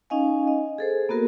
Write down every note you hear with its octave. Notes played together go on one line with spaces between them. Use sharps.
C#4 D#4 D#5 F5 G#5
D#5
G#4 A4 C5
A#3 B3 F#4 A#4